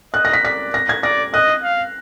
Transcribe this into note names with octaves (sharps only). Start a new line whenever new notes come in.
D#5 F#6
A#6
B6
D5 B6
A#6
G#6
D5 A#6
D#5 F#6
F5